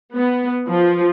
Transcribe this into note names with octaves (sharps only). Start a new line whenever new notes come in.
B3
F3